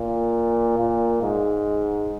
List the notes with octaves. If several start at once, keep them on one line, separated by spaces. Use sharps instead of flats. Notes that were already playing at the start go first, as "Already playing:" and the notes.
Already playing: A#2
A#2
G#2